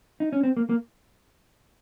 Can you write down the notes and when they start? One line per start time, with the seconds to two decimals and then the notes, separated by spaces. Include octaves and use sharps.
0.20 D#4
0.33 C#4
0.43 C4
0.57 A#3
0.69 A#3